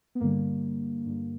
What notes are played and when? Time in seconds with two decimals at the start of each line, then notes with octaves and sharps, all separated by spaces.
0.15 B3
0.20 G2 D3 G3 A#3
1.06 G2 D3 G3